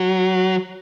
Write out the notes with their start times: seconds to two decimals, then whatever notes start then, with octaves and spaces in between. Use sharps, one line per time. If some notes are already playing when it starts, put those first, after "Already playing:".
Already playing: F#3